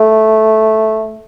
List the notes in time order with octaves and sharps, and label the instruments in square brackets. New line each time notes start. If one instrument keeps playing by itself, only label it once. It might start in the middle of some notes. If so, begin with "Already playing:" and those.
Already playing: [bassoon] A3